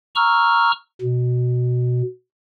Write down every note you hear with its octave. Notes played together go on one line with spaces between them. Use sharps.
A#5 C#6 E6 F6
B2